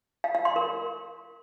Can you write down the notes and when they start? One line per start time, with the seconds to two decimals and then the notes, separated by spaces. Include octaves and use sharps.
0.24 F5
0.35 F5
0.45 C6
0.56 A#4